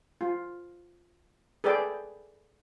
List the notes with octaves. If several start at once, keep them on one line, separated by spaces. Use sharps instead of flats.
F4
G#4 A4 B4 D5 G5